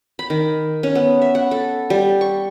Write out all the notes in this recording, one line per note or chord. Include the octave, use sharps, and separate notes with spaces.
B5
D#3
C#4
B3
E5
F#5
A4
G3
C#6